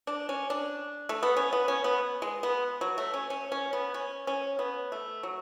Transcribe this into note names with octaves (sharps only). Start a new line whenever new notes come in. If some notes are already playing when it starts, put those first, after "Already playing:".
D4
C#4
D4
A3
B3
C#4
B3
C#4
B3
G#3
B3
F#3
A3
C#4
C#4
C#4
B3
C#4
C#4
B3
A3
F#3